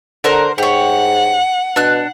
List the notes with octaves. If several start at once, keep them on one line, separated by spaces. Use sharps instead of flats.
D3 A#4 C5 F#5
G#2 G4 C#5 F#5
B2 D4 F#6